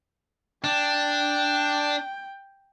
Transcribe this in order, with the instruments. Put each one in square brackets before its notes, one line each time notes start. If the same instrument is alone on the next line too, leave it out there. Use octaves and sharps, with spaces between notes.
[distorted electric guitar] D4 [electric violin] G5